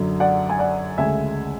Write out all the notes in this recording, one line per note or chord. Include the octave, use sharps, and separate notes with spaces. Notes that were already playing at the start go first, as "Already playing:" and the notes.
Already playing: F#2 D3 F#3
D5 F#5
G#5
D5 F#5
D2 C#3 G#3 E5 G#5